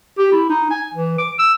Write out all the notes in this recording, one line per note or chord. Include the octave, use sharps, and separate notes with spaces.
G4
E4
D#4
G#5
E3
D6
E6